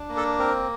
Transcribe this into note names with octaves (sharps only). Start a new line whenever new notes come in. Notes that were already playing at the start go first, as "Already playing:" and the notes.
Already playing: D4
A#3
A4
C4 A#4